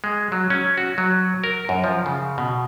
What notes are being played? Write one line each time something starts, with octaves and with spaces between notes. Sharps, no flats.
G#3
F#3
C#4
F#4
F#3
A#4
F#2
F3
C#3
B2